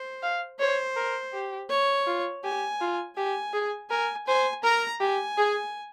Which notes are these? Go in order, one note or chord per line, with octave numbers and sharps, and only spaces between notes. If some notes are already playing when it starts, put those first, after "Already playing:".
Already playing: C5
F5
C5 C#5
A#4
G4
C#5
F4
G4 G#5
F4
G4 G#5
G#4
A#4 G#5
C5 G#5
A#4 A#5
G4 G#5
G#4